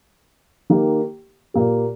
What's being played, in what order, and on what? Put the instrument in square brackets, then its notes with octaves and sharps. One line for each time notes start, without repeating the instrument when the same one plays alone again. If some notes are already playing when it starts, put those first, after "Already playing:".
[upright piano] D#3 A#3 G4
A#2 A#3 G4